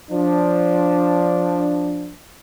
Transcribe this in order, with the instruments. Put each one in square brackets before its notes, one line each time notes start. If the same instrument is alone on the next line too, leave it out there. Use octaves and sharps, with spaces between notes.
[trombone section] F3 D4